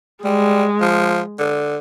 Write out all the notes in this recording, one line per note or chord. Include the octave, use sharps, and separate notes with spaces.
G3 G#3
F3
D3